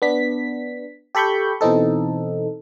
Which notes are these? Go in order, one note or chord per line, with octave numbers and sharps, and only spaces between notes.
B3 D4 B6
G4 A4 B5 C#6 G6
B2 E3 C4 D#4 A4